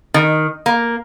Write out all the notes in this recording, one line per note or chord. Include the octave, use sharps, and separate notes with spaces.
D#3
A#3